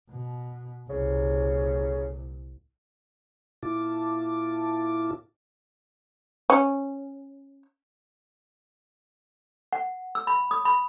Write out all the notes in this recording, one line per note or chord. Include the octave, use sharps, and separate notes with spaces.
B2
C2 A#2 C#3
A#2 E4 F4 A5 D6
C#4
F#5
E6
B5
D#6
B5